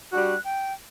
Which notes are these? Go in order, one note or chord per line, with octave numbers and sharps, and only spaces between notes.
G3 D4 F#4 F#6
G5